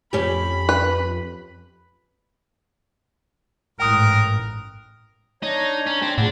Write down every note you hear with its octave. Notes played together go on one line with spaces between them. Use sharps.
F2 C#4 G4 B5
B4
A1 G#2 A#4 G5 D#6 F#6
D4 D#4 C#5 A#5
C#4
C4
A2 C#3 F3 D4 F#5